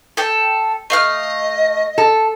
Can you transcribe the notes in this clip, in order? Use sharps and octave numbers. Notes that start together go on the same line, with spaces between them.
A4 G5
A3 D#5 F5 F6
A4